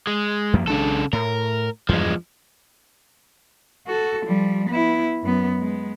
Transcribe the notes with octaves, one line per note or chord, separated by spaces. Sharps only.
G#3
F#2 F3 A#3
B1 C#3 G#3 D4 A4
A2 A#4
E2 G2 F3 G#3
F#4 A4
F3 G3
B3 E4
F#2 B3
G#3 B3